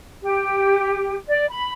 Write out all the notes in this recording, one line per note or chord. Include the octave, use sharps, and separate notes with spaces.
G4
D5
B5